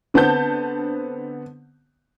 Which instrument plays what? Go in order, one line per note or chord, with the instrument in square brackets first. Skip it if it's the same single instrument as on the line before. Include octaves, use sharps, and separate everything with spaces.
[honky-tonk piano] D3 B3 C4 A5 G6